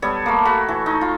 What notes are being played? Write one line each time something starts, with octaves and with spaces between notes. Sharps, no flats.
G3 B3 A4 C#5
A3 A#3
F#4 A4 B5
E3
D#4
F4